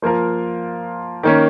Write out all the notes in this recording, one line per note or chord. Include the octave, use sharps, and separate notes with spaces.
F3 A#3 F4 A#4
D#3 A#3 C#4